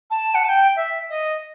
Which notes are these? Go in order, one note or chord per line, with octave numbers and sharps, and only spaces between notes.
A5
F#5
A5
G5
E5
D#5